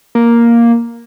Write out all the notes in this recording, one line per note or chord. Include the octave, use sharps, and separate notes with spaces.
A#3